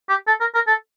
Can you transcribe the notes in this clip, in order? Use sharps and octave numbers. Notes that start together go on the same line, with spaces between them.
G4
A4
A#4
A#4
A4